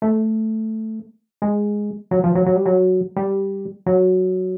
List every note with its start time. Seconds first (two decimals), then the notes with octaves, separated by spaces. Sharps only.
0.02 A3
1.42 G#3
2.11 F#3
2.24 F3
2.35 F#3
2.46 F#3
2.56 G3
2.66 F#3
3.16 G3
3.86 F#3